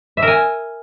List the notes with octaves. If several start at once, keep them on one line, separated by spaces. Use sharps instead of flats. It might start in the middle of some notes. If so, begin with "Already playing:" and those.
E5
A#4
G#5